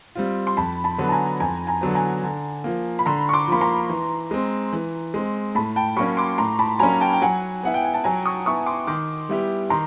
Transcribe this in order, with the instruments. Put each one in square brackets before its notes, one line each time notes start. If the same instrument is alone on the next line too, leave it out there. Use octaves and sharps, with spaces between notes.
[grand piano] G3 C4 F4
[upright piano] C6
[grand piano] F2 [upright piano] A5 B5
[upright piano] A5 B5
[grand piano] D3 F#3 B3
[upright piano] A5
G#5 A#5
[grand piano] F2 [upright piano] G#5 A#5
[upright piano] G#5 A#5
[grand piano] D3 F#3 B3
[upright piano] G#5 A#5
[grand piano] D3
F3 A#3
[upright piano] B5
[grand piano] D3 [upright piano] A#5 C6
[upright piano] C#6
C6 D6
[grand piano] F3 A#3 [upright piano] B5
[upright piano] A#5 C6
[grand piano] E3
G#3 C4
E3
G#3 C4
[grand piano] A2 [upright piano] A5 B5
[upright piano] G5 A5
[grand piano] F#3 A#3 C#4 [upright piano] B5 C#6
[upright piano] C6 D6
[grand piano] A2 [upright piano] A#5 C6
[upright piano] A5 B5
[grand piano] F#3 A#3 C#4 [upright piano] G#5 A#5
[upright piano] G5 A5
G5
[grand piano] F#3 [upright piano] F#5 G#5
[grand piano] B3 E4 [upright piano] F#5
[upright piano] G5
G#5
A5
[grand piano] F#3 [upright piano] G#5 A#5
[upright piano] C#6 D#6
[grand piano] B3 E4 [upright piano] C#6 D#6
[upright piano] C6 D6
[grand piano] D#3 [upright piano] C6 D6
[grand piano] G3 B3 E4 G4
[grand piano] D#3 [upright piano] A#5 C6